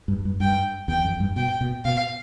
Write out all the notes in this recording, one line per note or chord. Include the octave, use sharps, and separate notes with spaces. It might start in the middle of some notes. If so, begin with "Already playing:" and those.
G2
G2
G2 G5
E2 G5
F2
G2
B2 G5
B2
B2 F5